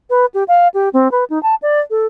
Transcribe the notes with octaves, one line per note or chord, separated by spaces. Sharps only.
B4
G4
F5
G4
C4
B4
D#4
A5
D5
A4